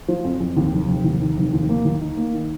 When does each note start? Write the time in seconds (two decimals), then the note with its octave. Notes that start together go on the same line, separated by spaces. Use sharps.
0.08 F3
0.24 F2
0.40 F2
0.56 D#2
0.72 F1
0.88 F1
1.04 D#2
1.21 D#3
1.37 F1
1.53 D#2
1.69 A#3
1.85 D#2
2.01 D#4
2.17 A#3
2.33 D#3